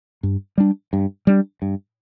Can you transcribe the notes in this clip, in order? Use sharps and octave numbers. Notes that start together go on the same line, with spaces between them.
G2
G3 D4
G2
G3 D4
G2